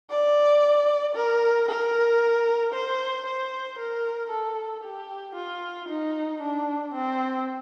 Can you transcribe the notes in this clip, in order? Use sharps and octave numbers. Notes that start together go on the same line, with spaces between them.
D5
A#4
A#4
C5
C5
A#4
A4
G4
F4
D#4
D4
C4